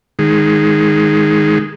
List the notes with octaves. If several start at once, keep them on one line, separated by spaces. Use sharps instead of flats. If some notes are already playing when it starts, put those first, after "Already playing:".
D#3 G#3